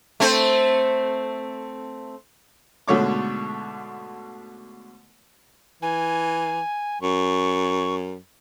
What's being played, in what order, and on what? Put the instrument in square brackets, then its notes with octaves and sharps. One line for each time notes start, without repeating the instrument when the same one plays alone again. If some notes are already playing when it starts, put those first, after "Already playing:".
[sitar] A3 C4 C5
[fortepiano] G#2 B2 D3 A3 C#5 D6
[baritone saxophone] E3 [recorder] G#5
[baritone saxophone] F#2 [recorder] C#6